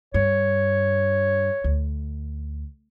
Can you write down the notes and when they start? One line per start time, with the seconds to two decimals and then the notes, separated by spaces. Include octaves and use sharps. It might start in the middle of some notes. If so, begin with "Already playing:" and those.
0.14 G2 C#5
1.64 D2